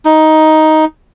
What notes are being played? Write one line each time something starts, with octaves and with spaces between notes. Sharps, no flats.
D#4